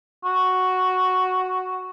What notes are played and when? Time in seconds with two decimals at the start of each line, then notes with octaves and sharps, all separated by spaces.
0.24 F#4